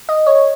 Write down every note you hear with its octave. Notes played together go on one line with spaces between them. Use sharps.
D#5
C#5